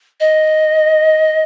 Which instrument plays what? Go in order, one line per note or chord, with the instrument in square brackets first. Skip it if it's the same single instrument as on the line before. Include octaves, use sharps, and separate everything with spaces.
[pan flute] D#5